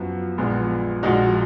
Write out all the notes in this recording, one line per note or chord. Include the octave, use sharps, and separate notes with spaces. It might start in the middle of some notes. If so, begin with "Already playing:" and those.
Already playing: F#2 F3 B3 F#4
A#1 A#2 G#3 B3
A#1 A#2 G#3 D#4 F#4